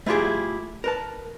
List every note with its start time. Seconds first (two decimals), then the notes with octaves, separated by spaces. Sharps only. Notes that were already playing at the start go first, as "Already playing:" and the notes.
0.06 A3 E4 F4 G4 G#4
0.84 A#4 B4 A5